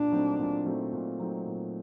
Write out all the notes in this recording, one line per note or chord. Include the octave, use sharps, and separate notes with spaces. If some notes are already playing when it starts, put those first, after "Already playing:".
Already playing: A#2 D4
F#3 A3 C4 D#4
A#2
F#3 A3 C4 D#4
A#2
F#3 A3 C4 D#4
A#2